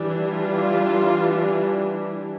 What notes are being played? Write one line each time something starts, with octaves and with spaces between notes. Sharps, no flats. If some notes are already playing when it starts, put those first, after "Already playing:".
Already playing: E3 G3 D4
F4